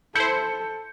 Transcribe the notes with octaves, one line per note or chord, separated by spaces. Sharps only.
E4 A4 C5 G6 C#7